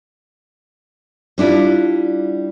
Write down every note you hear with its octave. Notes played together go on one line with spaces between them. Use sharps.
G3 D4 E4 F4